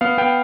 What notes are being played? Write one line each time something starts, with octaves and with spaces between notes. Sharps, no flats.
B3 F5
B3 G5